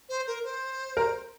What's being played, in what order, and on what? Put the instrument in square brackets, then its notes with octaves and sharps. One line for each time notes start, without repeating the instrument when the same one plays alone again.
[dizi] C5
A#4
C5
[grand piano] A#4